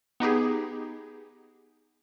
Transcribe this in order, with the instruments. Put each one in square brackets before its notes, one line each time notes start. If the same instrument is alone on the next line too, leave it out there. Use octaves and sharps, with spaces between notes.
[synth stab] B3 D#4 G4 G#4